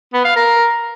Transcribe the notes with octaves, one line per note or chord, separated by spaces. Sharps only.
B3
F5
A#4